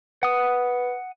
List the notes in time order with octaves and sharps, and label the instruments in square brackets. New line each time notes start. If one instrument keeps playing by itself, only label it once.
[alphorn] B4 [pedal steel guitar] F#5 D#6